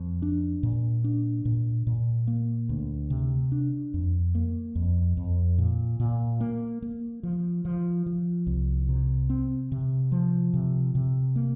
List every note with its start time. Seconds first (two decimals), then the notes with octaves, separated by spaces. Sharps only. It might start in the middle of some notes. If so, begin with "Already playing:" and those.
Already playing: F2
0.22 D4
0.63 A#2
1.04 D4
1.45 A#2
1.87 A#2
2.27 A#3
2.69 D2
3.10 C3
3.52 D4
3.94 F2
4.35 A#3
4.75 F2
5.17 F2
5.58 A#2
6.00 A#2
6.40 A#3
6.82 A#3
7.23 F3
7.65 F3
8.06 F3
8.47 C2
8.89 C3
9.30 C4
9.72 C3
10.12 F3
10.54 C3
10.95 C3
11.36 A#3